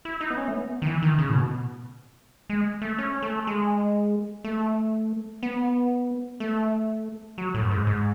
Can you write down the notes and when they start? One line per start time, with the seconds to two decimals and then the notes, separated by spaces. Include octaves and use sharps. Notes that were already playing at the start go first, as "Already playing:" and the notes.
0.05 E4
0.21 D#4
0.30 B3
0.37 C#4
0.48 A3
0.54 B3
0.82 D#3
0.87 E3
1.03 D#3
1.18 C#3
1.29 A2
1.35 B2
2.50 G#3
2.82 A3
2.98 C#4
3.22 A3
3.47 G#3
4.44 A3
5.43 B3
6.40 A3
7.38 F#3
7.54 A2
7.63 F#2
7.71 G#2
7.87 G#2